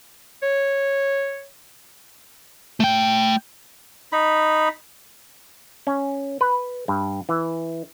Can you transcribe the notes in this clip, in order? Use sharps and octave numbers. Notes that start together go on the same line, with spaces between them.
C#5
A3 G5
D#4 B5
C#4
B4
G2
E3